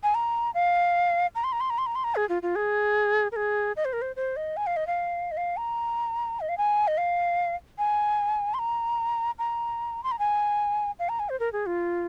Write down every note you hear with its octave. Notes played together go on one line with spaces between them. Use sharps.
G#5
A#5
F5
A#5
C6
A#5
C6
A#5
C6
A#5
C6
A#5
G#4
F4
F4
G#4
A#4
G#4
D#5
C5
A#4
C5
C5
D#5
G#5
F5
D#5
F5
D#5
F5
A#5
D#5
F5
G#5
D#5
F5
G#5
C6
A#5
A#5
C6
A#5
G#5
F5
A#5
G#5
C5
A#4
G#4
F4